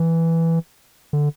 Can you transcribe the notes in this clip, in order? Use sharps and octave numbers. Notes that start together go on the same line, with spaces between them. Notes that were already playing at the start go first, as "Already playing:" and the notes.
Already playing: E3
D3